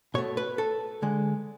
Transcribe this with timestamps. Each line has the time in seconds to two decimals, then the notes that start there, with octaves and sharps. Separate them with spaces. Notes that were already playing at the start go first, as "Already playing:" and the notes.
0.14 B2 A3 C#5
0.37 B4
0.58 A4
1.02 D3 G#3